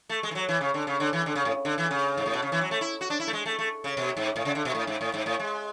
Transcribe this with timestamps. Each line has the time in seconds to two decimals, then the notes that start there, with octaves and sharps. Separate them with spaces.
0.09 A3
0.23 G#3
0.31 E3
0.35 F#3
0.49 E3
0.61 C#3
0.74 D3
0.87 C#3
1.00 D3
1.13 E3
1.26 D3
1.35 C#3
1.45 A2
1.65 D3
1.78 E3
1.91 C#3
2.18 G#2
2.26 A2
2.34 B2
2.42 C#3
2.52 E3
2.61 F#3
2.71 A3
2.81 E4
3.01 F#4
3.10 D4
3.20 E4
3.27 A3
3.33 G#3
3.46 A3
3.59 A3
3.84 C#3
3.97 B2
4.17 G#2
4.36 A2
4.45 C#3
4.55 D3
4.65 B2
4.75 A2
4.87 G#2
5.01 A2
5.14 G#2
5.26 A2
5.40 G#3